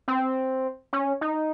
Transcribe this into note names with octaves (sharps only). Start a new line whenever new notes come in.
C4
C#4
D#4